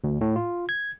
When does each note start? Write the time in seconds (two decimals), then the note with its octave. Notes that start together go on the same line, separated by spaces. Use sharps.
0.04 D2
0.21 A2
0.36 F4
0.69 G#6